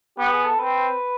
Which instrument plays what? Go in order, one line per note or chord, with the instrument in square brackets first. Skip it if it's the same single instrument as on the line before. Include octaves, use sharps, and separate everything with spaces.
[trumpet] B3 [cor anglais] G4
[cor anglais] G#4
A4
[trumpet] C4 [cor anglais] B4